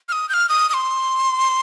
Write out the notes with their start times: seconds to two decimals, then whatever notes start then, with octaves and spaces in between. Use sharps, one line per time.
0.09 F6
0.12 D#6
0.29 G6
0.34 F6
0.49 D#6
0.69 D#6
0.74 C6